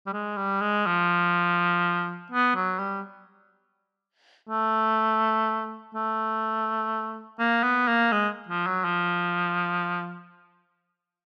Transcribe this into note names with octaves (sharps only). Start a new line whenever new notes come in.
G3
G#3
G3
G#3
F3
B3
F#3
G3
A3
A3
A#3
B3
A#3
G#3
F3
F#3
F3